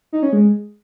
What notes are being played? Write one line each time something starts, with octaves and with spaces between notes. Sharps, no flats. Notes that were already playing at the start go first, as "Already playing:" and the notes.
D#4
C#4
G#3